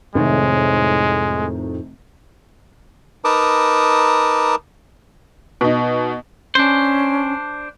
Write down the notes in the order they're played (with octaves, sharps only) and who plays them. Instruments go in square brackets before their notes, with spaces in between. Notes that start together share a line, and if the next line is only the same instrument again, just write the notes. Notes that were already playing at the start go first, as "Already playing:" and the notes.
[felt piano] F1 C3 D#3 [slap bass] F2 A2 [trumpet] G#3
[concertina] D#4 A#4 B4 A5 D6 D#6
[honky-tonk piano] B2 D#4
[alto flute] C#4 [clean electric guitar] D4 C5